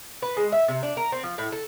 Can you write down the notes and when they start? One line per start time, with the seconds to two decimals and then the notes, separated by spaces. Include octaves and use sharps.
0.22 B4
0.37 G#3
0.52 E5
0.68 C3
0.83 D4
0.97 A#4
1.12 C4
1.23 F3
1.38 A2
1.52 A4